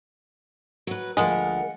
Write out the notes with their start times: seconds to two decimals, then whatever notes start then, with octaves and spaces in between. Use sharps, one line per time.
0.87 F#3 B4
1.17 D2 F3 G#3 A#4 F#5